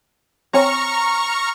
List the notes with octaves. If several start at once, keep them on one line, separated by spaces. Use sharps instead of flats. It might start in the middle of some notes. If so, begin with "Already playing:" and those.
C4 C#5 G#5 A#5 C#6 F6